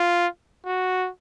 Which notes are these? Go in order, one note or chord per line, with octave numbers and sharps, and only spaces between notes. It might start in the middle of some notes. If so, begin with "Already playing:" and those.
Already playing: F4
F#4